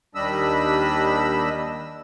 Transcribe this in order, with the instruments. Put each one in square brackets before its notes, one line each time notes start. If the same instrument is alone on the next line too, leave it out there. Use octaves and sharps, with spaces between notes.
[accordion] D#2 G3 D4 D#5 B5 E6